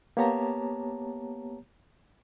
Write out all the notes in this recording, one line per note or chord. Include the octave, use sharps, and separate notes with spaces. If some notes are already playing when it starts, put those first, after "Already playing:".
A#3 B3 G4 C#5 A5 A#5